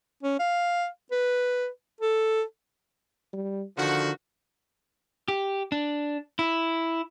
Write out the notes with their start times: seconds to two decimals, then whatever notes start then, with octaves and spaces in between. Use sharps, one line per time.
0.23 C#4
0.39 F5
1.11 B4
2.01 A4
3.33 G3
3.78 D3 D#3 F3 F#4
5.28 G4
5.72 D4
6.39 E4